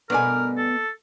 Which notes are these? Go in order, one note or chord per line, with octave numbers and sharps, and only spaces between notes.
G2 B2 A3 B3 A#4 D5 G#5
A4